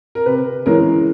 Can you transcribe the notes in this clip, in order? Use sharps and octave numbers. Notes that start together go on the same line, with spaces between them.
A#4
C3 B4
E3 G#3 C#4 A#4